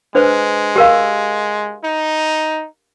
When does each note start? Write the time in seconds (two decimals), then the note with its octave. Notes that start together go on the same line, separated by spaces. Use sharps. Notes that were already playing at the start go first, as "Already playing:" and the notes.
0.15 G#3 D4 B4 C5
0.76 G4 A#4 F5
1.84 D#4